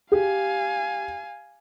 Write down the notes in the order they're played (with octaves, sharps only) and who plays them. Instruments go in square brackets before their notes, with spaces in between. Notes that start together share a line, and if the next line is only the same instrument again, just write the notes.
[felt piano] G4 [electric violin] F5 G#5